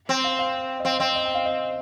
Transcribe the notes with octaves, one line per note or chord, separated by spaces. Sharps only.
C4
F5
F5
D#5
C4 F5
C4 D#5
D#5
G5
F5
D#5